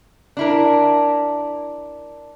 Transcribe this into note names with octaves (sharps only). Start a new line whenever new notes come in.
D4 E4 A#4